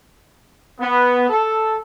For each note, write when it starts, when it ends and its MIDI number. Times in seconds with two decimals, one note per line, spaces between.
0.80 1.28 59
1.29 1.76 69